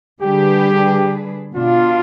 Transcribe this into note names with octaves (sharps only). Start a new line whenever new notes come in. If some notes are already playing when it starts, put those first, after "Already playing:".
D3 G3 D4 G4 G#4 B4
B2 B3 D4 F4